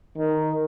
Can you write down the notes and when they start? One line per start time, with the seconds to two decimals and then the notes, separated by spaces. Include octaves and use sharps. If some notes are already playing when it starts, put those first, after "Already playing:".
0.17 D#3